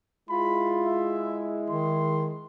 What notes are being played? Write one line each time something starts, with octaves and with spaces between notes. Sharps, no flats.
G#3 E4 F4 B5
E5
D#3 C6